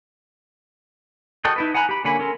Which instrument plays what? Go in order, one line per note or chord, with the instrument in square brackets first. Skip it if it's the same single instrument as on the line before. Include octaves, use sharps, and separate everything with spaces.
[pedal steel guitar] F#4 A4 D#5 G5
D#4 E4 B4
F#5 G#5 A#5 B5 F#6
G4 B5
D3 A#3 C#4 G#5 B5
C#4 A4 A#4 C6